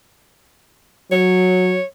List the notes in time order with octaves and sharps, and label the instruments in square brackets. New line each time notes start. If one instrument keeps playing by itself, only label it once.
[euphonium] F#3 [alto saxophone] C#5